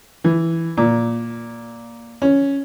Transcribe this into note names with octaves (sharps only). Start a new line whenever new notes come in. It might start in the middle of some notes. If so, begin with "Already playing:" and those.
E3
A#2
C#4